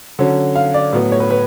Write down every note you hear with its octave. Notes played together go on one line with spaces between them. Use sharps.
D3 F#3 C#4
F5
D5
A2 F#3 B3
C#5
B4
B4